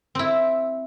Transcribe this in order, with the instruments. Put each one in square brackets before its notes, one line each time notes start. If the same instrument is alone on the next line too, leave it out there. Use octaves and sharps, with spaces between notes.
[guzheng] C4 E4